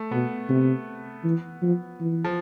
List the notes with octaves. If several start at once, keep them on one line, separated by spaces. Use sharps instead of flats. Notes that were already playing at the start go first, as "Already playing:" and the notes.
Already playing: A3
B2 B3
C3
E3
F3
E3
F3